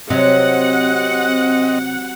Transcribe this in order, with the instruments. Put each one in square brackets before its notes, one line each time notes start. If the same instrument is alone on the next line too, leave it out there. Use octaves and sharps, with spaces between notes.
[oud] C3 [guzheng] F#3 [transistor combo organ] C4 D#5 [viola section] F#5